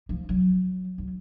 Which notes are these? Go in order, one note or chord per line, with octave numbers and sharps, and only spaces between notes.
F3
F#3
F#3